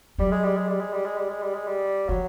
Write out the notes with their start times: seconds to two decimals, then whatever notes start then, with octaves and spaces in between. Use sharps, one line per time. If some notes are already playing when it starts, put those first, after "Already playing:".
0.18 F#3 G3
0.31 G#3
0.44 G3
0.56 G#3
0.68 G3
0.80 G#3
0.93 G3
1.05 G#3
1.17 G3
1.29 G#3
1.42 G3
1.54 G#3
1.67 G3
2.08 F3 F#3